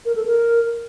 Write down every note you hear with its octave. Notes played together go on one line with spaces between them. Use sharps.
A#4
A4
A#4